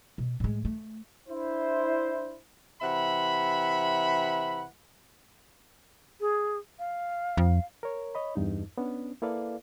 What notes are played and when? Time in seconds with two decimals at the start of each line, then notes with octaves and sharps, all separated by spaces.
0.18 B2
0.40 A2 G#3
0.65 A3
1.29 D4 E4 C5
2.82 C3 E3 E5 F#5 B5
6.21 G#4
6.79 F5
7.37 F2
7.83 A#4 C#5
8.15 C#5 D#5 B5
8.35 E2 G2 D#4
8.78 B3 C#4 D4
9.22 A#3 E4 A4 B4 D5 F5